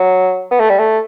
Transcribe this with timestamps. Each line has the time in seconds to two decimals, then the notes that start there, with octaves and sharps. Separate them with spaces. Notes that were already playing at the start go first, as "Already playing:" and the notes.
Already playing: F#3
0.51 B3
0.60 A3
0.70 G3
0.79 A3